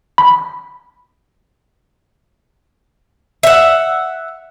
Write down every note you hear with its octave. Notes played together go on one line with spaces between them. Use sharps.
B5
E5 F#5